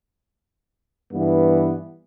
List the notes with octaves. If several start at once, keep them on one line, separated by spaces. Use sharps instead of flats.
G2 E3 B3